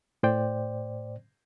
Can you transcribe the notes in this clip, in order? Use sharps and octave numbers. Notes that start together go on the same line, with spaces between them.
A2 C5 D5 G5